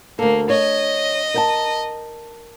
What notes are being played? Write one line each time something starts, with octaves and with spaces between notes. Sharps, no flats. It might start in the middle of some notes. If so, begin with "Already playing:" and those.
D2 A#3 A4
C#5 D#5
A#4 G5 A5